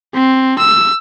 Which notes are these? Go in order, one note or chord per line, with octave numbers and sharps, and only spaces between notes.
C4
E6